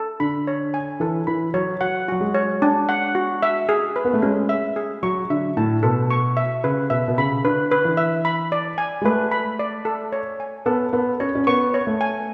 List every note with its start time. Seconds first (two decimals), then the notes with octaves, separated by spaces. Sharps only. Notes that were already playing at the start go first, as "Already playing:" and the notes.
Already playing: A4
0.20 D3 B5
0.47 C#5
0.74 G#5
1.00 E3 A4
1.27 E3 B5
1.54 F#3 C#5
1.81 F#3 F#5
2.08 F#3 F#4
2.21 G#3
2.34 C#5
2.62 D4
2.89 F#5
3.15 F#4
3.43 E5
3.69 G#4
3.96 B4
4.05 B3
4.14 A3
4.22 G#3 C#4
4.49 E5
4.76 G#4
5.03 F#3 C#6
5.30 D3 E5
5.57 A2 A5
5.83 B2 A4
6.10 C#6
6.37 E5
6.64 C#3 B4
6.90 B2 E5
7.08 B2
7.18 C#3 B5
7.44 D3 B4
7.71 B4
7.85 E3
7.97 E5
8.25 B5
8.52 D5
8.78 G#5
9.02 G#3
9.05 A3 B4
9.31 B5
9.59 D5
9.85 A4
10.12 C#5
10.40 G#5
10.66 B3 A4
10.93 B3 A4
11.20 C#4 C#5
11.35 C#4
11.47 B3 C#6
11.74 C#5
11.87 A3
12.01 G#5